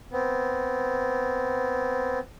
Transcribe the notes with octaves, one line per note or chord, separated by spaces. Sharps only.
B3 C4